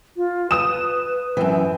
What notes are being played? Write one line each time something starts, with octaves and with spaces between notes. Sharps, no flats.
F4
B4 D#6 E7
F#2 E3 G5